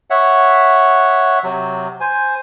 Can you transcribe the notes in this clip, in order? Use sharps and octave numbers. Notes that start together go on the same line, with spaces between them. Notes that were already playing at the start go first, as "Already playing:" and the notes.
C#5 E5 F#5
C3 F#3
C5 G#5